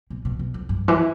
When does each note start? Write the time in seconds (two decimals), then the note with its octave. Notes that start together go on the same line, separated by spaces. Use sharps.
0.10 B2
0.25 B2
0.39 B2
0.54 F2
0.69 G2
0.88 E3